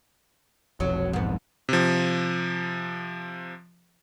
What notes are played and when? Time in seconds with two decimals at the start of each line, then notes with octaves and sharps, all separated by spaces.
0.80 F1 B1 F2 F#3
1.13 G#2 B3
1.69 C3 F3